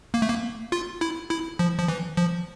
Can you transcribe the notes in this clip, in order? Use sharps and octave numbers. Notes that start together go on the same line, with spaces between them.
A#3
A3
A#3
F4
E4
E4
F3
F3
E3
F3